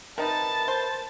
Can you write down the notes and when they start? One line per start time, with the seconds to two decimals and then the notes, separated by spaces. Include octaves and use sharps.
0.18 C3 D#4 A#4 B4 A5 A6
0.68 C5